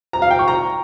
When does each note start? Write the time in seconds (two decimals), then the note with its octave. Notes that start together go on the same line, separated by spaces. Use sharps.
0.13 A#5
0.22 F5
0.31 G5
0.39 C#6
0.48 A#5